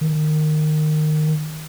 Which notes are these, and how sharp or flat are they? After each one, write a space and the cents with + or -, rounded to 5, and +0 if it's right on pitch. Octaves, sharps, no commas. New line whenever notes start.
D#3 -20